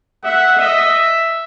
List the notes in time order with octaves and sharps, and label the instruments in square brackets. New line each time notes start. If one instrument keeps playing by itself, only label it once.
[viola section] E5 [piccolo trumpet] F#5
[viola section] D#5 [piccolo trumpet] E5